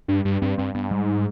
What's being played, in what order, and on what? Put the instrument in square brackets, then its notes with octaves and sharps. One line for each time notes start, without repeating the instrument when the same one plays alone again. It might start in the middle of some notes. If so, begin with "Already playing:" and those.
[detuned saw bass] G2
G2
[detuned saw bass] G2 [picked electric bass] C4
[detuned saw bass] G2 [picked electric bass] C4
[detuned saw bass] G2 [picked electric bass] B3
[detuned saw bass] G#2 [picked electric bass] G3